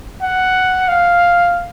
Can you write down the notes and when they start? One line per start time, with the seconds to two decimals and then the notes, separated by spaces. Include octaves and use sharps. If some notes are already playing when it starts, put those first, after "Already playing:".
0.22 F#5
0.88 F5